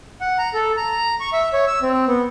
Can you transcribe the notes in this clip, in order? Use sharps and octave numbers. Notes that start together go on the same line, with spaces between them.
F#5
A#5
A4
A#5
C#6
E5
C#5
E6
C4
B3